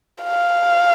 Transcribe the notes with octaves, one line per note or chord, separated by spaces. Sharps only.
F5